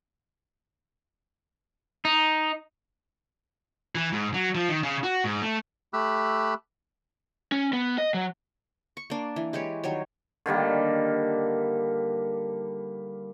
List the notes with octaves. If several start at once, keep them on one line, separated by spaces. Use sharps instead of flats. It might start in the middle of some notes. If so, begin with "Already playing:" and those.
D#4
E3
G#2
F#3
F3
D#3
C#3
F#4
G#2
A3
A3 G4 B5 E6 F#6
C#4
B3
D#5
F#3
C#6
A#3 D4
E3
G#3 G4 B4 C#5
D#3 F#3 G3 C#5
D3 D#3 G3 A#3